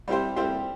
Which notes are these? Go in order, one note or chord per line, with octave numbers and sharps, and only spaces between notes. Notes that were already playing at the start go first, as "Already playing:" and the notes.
G3 C4 E4 G4 C5
G3 C4 E4 G4 C5